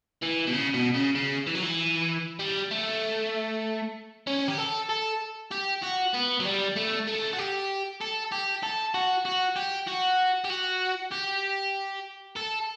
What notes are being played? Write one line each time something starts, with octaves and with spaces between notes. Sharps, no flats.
E3
B2
C#3
B2
C#3
C#3
E3
F#3
E3
G3
A3
C#4
G4
A4
A4
G4
F#4
B3
F#3
G3
A3
A3
F#4
G4
A4
G4
A4
F#4
F#4
G4
F#4
G4
F#4
G4
A4